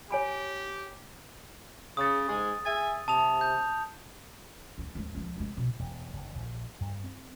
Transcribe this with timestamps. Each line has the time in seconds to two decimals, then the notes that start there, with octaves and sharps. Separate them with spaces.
0.11 G4 C#5 G#5 B5
1.97 C#3 D#6 A6
2.28 G#2 G#3 G#4
2.65 G#4 E5 G#5 A6
3.08 C3 A5 D#6 F7
3.41 G6
4.78 D#2 G#2
4.95 D#2 G#2
5.15 C#2 F3
5.36 C2 G#3
5.57 B2
5.79 E1
6.14 F#1
6.35 A#1
6.81 G2
7.04 C4